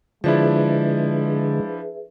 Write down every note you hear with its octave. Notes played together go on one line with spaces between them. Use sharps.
D3 F3 G#3 D4 E4 G#4 B4 E5